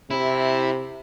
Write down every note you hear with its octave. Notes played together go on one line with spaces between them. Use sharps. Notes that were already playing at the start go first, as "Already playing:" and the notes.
C3 E4